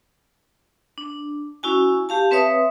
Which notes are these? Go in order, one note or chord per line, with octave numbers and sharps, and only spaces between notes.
D4
C#4 E4 F#4 G#5
G4 F5 A5
C4 B4 C#5 E5 D#6